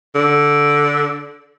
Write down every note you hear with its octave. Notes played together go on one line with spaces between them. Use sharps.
D3